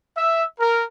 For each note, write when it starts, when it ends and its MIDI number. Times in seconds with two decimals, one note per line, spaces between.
0.17 0.43 76
0.60 0.84 70